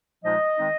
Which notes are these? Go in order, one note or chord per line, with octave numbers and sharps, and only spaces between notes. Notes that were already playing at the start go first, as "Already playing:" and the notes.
A#2 F3 G#3 D#4 D#5
D#3 G#3 C4 D#4